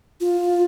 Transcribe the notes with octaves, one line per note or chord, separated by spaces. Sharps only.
F4